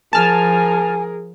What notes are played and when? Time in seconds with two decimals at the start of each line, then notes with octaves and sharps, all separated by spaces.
0.13 F3 G#4 A#4 G#5 A5 F6